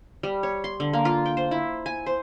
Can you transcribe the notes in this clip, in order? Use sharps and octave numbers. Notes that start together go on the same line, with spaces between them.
G3
C#5
C6
D3
A#3
F4
G5
C5
E4
G#5
C5